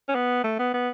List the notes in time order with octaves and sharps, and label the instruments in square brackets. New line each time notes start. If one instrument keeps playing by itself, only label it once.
[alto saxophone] C#4
B3
A3
B3
B3